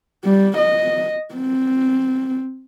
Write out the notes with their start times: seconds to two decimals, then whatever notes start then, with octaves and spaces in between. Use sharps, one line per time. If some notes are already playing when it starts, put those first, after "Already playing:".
0.25 G3
0.58 D#5
1.34 C4